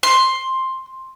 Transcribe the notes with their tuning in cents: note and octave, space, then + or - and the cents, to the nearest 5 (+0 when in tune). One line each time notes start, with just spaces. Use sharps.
C6 +10